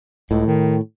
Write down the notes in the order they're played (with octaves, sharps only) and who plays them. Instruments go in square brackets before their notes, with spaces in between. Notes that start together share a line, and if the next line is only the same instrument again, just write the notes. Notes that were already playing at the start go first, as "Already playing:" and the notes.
[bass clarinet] C#2 [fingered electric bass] A2
[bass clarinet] D#3